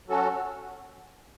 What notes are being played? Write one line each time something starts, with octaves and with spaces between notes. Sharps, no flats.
F#3 C#4 F#4 A4